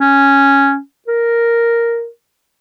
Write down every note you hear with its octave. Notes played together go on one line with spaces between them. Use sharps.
C#4
A#4